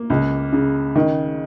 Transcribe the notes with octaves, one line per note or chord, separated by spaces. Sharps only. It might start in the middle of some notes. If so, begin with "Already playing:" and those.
Already playing: A#3
C#2
C#3
D#3